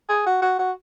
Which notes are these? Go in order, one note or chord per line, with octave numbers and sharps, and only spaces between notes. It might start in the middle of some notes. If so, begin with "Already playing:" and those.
G#4
F#4
F#4
F#4